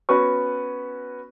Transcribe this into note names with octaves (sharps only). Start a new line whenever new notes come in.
B3 C#4 F#4 B4 C#5 C#6